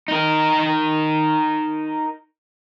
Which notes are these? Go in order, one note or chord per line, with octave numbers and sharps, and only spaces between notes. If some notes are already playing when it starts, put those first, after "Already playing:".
D#4 A#4